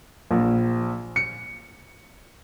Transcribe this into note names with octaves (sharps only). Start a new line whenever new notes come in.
A#1
C#7